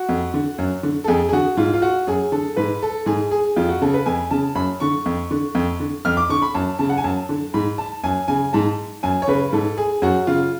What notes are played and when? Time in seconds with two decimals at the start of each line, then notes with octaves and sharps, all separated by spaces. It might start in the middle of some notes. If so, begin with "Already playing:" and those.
Already playing: F#4
0.09 F2
0.34 D3
0.58 F#2
0.83 D3
1.04 A4
1.08 F2 G#4
1.29 G#4
1.32 D3 F#4
1.57 G#2 F4
1.74 F4
1.82 F#4
2.07 F#2 G#4
2.32 D3 A4
2.56 G#2 B4
2.82 A4
3.06 G#2 G#4
3.31 G#4
3.56 F2 F4
3.69 F#4
3.82 C#3 A4
3.94 B4
4.06 F2 G#5
4.31 C#3 A5
4.55 F#2 B5
4.80 D3 C#6
5.06 F2
5.31 D3
5.55 F2
5.80 D3
6.05 F2 F6
6.17 D6
6.29 D3 C#6
6.42 B5
6.55 F#2 A5
6.79 C#3 A5
6.89 F#5
6.97 G#5
7.04 F#2 A5
7.29 D3
7.54 G#2 B5
7.78 A5
8.04 F#2 G#5
8.28 C#3 G#5
8.53 G#2 A5
9.03 F#2 G#5
9.22 C#5
9.27 C#3 B4
9.52 G#2 A4
9.78 G#4
10.02 F#2 F#4
10.27 C#3 F4